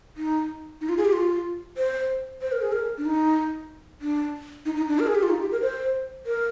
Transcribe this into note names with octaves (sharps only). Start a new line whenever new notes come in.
D#4
D#4
F4
G#4
G4
F4
C5
C5
A#4
G#4
A#4
D4
D#4
D4
D#4
D#4
D4
A#4
G#4
G4
F4
D#4
G4
A#4
C5
A#4